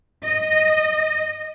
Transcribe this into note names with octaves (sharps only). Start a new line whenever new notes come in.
D#5